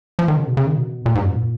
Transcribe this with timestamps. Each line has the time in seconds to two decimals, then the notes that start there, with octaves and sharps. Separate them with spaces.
0.19 F3
0.28 D#3
0.37 C#3
0.47 B2
0.57 C#3
0.67 D#3
0.76 B2
1.06 A#2
1.15 G#2
1.24 F#2
1.35 A#2